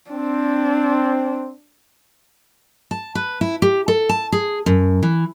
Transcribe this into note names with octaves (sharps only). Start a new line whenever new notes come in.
C4 D4
A5
B4
E4
G4
A4
A5
G#4
F#2
E3